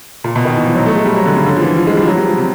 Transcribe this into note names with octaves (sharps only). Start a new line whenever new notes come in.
A#2
B2
D#3
E3
F3
F#3
A3
G#3
G3
F#3
D3
C#3
D3
F3
E3
F3
G#3
G3
F3
F#3
G3
F3
C3